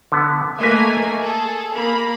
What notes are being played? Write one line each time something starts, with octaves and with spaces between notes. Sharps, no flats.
D3 B3
A3 A#3 B4 D#5 E5 G#5
G#4 A4 G#5
A#3 B5